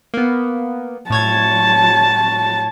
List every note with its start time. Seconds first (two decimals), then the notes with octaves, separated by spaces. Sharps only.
0.14 A#3 B3
1.10 A2 C#5 A5 G#6